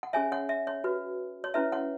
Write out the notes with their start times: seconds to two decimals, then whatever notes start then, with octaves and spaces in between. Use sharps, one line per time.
0.03 F#5
0.13 C#4 G#4 C#5 E5 G#5
0.32 C#5 F#5
0.49 E5
0.67 C#5
0.84 F#4 B4
1.44 C#5
1.54 C#4 E4 B4 E5
1.72 C#5 F#5